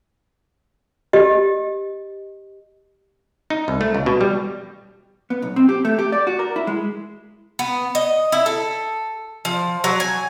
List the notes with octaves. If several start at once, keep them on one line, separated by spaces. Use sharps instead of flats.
G4 D#5
D#4
C2
A3
C#2
B2
G3
B3
B1
C4
G4
A3
G4
D5
F#4
A#4
E4
G#3
B3
D#5
E4
A4
F3
F#3
G#5